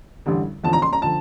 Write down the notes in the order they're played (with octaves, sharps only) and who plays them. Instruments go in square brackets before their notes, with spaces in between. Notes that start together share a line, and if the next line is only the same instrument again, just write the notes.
[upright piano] A1 G2 D3 G3
E2 D3 F3 A5
A#5
C6
A#5
D3 F3 A5